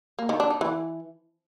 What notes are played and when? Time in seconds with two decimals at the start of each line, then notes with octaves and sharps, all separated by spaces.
0.19 A#3
0.29 D#3
0.40 D4
0.50 D#4
0.61 E3